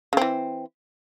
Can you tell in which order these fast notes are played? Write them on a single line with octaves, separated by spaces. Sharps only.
C#3 C4 E3